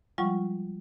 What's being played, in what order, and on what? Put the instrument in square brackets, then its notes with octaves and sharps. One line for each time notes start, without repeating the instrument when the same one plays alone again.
[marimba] F3 G3 G#3 F4 F#5 C#6